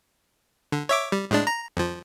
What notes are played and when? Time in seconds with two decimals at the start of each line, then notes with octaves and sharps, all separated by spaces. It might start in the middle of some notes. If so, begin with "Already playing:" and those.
0.72 D3
0.89 C#5 E5 D6
1.12 G3
1.31 A2 G#3 D4
1.47 A#5
1.77 F2 F3